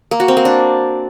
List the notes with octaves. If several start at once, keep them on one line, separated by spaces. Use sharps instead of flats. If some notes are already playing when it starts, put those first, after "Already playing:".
A#3
F#4
C4
A#3
D4